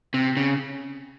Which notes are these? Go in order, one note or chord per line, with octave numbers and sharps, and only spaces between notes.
C3
C#3